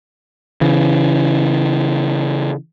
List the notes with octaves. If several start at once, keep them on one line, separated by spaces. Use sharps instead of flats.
C#3 E3